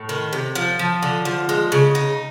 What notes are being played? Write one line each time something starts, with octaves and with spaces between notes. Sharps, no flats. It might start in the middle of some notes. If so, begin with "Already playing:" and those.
Already playing: A2
D#3
C3
F3
F3
D3
F3
G#3
C#3
D#4